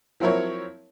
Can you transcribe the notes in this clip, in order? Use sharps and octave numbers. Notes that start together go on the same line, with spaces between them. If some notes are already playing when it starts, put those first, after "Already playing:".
F3 F#3 C4 E4 A#4 C#5